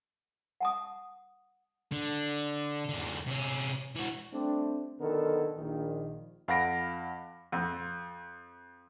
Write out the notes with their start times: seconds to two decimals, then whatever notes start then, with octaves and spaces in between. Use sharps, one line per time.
0.61 F#5 A5 D#6
1.92 D3
2.89 E2 D3
3.26 C3 C#4
3.96 E3 F#4
4.33 G3 A3 C4 D4
5.00 B1 D3 D#3 B3 A4 A#4
5.57 A#1 D#3
6.48 F2 F5 F#5 B5 A#6 D7
7.52 F2